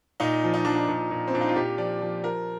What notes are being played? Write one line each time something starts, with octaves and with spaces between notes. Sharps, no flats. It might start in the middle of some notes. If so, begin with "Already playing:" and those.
A#2 D#4
F3
D#4
F3 D4
D#4
A#2
A#2
C4
A#2 D4
D#4
F4
A#2 G4
F3 D5
F3
F3 A#4